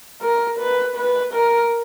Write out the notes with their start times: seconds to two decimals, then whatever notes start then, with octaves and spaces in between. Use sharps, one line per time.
0.22 A#4
0.59 B4
0.96 B4
1.33 A#4